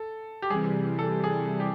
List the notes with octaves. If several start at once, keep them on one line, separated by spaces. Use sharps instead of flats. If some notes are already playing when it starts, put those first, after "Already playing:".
Already playing: A4
G4
C3 E3 G3 G#4
A4
G#4
G4